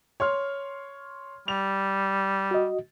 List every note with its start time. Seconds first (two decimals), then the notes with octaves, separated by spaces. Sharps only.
0.20 C#5 C6 F6
1.48 G3 F7
2.51 F#4 D#5